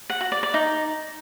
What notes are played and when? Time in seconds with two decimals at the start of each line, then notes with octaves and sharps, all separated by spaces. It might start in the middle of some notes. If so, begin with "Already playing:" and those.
0.10 F#5
0.21 F#4
0.32 D5
0.43 D5
0.54 D#4